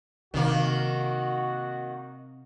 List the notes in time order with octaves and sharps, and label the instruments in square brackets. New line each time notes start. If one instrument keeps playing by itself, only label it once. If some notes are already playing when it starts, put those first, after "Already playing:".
[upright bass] C3 [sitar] D#3 A#3 [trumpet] F#4